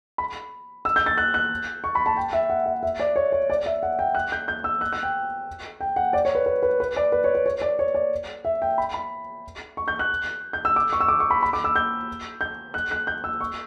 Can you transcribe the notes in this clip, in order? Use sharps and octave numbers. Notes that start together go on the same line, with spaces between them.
B5
E6
G6
A6
F#6
F#6
C#6
B5
A5
G5
E5
F#5
E5
E5
D5
C#5
C#5
D5
E5
F#5
G5
F#6
G6
G6
E6
F#6
F#6
G5
G5
F#5
D5
C#5
B4
B4
B4
B4
D5
B4
C#5
B4
C#5
D5
C#5
D5
E5
G5
B5
B5
C#6
G6
F#6
G6
E6
D6
C#6
E6
D6
C#6
B5
B5
D6
E6
G6
G6
F#6
F#6
G6
E6
C#6